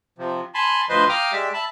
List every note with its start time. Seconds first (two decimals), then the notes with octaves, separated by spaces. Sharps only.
0.18 C3 F3
0.54 G#5 A5 B5 C6
0.89 D2 F3 B4 C5 D#5 C6
1.09 F5 G5 A#5 D6 D#6 F6
1.33 G#3 G4 D5 E5
1.54 E5 A5 B5